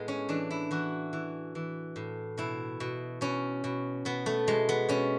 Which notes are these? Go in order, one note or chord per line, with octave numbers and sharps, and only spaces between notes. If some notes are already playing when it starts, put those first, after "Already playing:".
Already playing: A2 G#3 B3
C#4
E3 D4
E4
E3 F#4
E3
E3
A2
B2 E4
B2
B2 C#4
B2
B2 B3
A3
B2 G#3
B3
B2 C#4